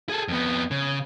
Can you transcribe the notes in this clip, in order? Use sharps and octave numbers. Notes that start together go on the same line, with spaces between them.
G#4 A4
F2 B3
C#3